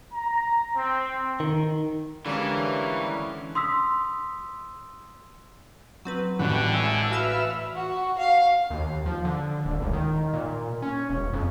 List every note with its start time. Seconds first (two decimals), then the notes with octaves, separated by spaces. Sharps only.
0.13 A#5
0.76 C4
1.40 D#3
2.26 D3 E3 G3 G#3 A#3 C#4 C#6
3.55 C6 D#6 E6 B6
6.05 F#3 C4 B4
6.39 A1 D3 G3 F#4 B5
6.74 G#3 E4
7.11 F#4 B4 E5 F5 E6 B6
7.75 F#4
8.18 F5
8.70 D#2
9.06 F3
9.25 D3
9.65 D#1
9.82 C#2
9.93 D#3
10.33 A#2
10.82 C#4
11.10 E1
11.33 F2